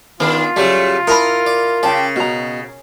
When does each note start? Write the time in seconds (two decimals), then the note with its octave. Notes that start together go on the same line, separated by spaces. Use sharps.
0.20 D#3 B3 D4 F4 G#4 B4
0.56 C#3 F#3 G3 A3 G#4 C#5
1.07 E4 A#4 A5 B5 D#6
1.46 D5
1.83 C#3 G4 D5 G5 A5
2.16 B2 F#4 A#5